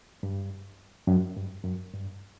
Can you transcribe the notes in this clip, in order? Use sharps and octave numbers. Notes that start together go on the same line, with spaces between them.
G2
F#2
G2
F#2
G2